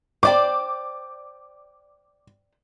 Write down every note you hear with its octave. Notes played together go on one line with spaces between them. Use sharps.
C5 D5 G5 D6